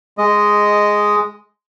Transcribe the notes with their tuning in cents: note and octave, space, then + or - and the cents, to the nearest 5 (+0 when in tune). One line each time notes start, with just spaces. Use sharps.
G#3 +0 D#5 +0